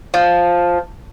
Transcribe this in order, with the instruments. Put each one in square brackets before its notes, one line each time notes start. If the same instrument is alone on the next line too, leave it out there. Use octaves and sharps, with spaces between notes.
[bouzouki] F3